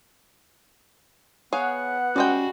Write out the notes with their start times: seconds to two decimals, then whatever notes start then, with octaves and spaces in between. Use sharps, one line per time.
1.53 B3 G#4 C#5 F5 F#5
2.16 G3 G#3 C#4 F#4 G5